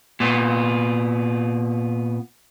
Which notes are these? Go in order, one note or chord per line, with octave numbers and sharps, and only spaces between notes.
A#2 B3